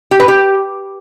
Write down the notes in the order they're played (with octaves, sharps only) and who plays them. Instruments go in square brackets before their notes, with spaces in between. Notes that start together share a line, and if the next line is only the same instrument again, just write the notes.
[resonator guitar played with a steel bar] G4
B4
G4